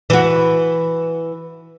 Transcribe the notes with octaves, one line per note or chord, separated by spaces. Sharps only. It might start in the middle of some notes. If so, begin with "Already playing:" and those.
E3 F#4